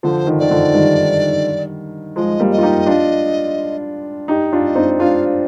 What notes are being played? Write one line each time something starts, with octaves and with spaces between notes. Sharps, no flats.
D3 F3 C5
D#3
D#3 D5
D3 F3
D#3 G3
F3 G#3 D#5
G3 A#3
D#5
F4
D#4 G4
D4 F4
D#4 G4
D4 F4
D#5
C4 D#4
D4 F4 F5